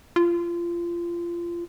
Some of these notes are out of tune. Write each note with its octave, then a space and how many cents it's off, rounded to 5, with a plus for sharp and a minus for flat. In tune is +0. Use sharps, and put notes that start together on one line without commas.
F4 -25